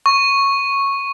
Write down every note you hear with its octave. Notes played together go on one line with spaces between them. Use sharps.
C#6